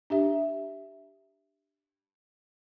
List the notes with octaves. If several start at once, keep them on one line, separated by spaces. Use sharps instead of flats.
D4 G4 E5